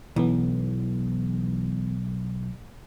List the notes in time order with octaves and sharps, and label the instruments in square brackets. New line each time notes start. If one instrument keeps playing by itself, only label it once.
[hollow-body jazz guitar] B1 [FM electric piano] E3 B3